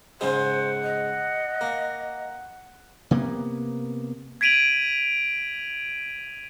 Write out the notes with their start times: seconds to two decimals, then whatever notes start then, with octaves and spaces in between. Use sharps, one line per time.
0.21 G#2 C#3 G#3 C5 F#5
0.83 D#5
1.61 A#3
3.11 C3 A#3 B3
4.41 G#6 B6 D7 D#7 F7 F#7